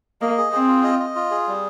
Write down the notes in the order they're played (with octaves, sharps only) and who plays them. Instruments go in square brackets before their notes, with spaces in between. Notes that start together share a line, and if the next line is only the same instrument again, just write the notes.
[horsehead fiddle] A#3 [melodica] D#5
[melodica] G#4
[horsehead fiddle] C4 [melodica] G#4
[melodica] F4
D#5
D#5
F4
G#4
G3